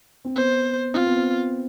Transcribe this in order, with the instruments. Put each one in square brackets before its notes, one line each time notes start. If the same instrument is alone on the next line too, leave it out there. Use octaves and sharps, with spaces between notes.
[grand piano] C4
[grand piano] B3 [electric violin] C5
[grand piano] C4 [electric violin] F4
[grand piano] B3
C4